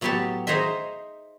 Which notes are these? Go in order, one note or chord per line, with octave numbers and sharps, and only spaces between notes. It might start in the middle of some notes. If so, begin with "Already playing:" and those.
A2 F#3 B3 G4 C#5 A5
D#4 G#4 C5 C#5 D#5 E5